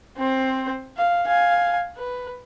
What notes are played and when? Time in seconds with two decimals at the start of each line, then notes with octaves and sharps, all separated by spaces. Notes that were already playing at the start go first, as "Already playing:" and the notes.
0.18 C4 C5
0.97 F5
1.27 F5 G#5
1.97 B4